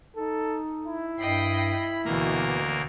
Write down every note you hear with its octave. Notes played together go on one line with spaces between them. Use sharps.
D#4 A4
E4
G2 D#5 G5 B5 C7
D2 B2 E3 A#3 A#4